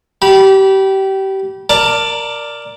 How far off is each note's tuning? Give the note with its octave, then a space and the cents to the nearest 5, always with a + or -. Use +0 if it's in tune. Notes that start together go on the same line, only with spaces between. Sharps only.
G4 -25 B5 -20
A#4 +0 D5 +0 A5 +30